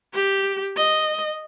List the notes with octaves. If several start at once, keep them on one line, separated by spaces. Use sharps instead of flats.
G4
D#5